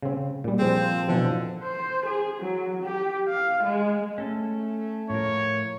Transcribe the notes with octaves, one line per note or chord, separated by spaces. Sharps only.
C#3 C4
A#2 G3
F3 C4 G#4 C5
B2 D3 E3 F3
C5
G#4
F#3
G4
F5
G#3
A3 C#4 A4
A2 F3 A#4 C#5